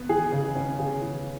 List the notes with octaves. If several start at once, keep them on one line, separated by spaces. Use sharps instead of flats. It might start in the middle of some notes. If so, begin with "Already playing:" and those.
Already playing: B3
E3 G#4
C#3
C#4
C#3 G#4
E3